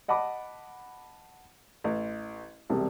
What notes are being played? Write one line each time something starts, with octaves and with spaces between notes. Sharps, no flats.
D#5 F#5 A5 B5 D6
A1
E1 C2 C3